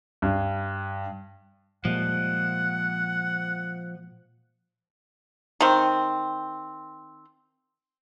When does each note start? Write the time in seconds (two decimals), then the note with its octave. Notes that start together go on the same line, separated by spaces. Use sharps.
0.22 G2
1.85 A#2 F3 G3 G#3 F#5
5.61 D#3 C4